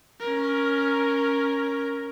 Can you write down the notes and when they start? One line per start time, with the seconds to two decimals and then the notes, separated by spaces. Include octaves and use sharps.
0.20 C#4 A#4